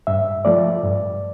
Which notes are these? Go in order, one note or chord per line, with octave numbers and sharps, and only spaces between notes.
G2 E5
F3 A3 D5
G2